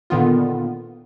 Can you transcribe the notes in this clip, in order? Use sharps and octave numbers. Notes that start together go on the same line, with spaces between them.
A#2 D3 D#3 B3 F4